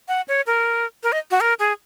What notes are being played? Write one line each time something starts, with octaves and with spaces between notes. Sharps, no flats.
F#5
C#5
A#4
A#4
D#5
F#4
A#4
G#4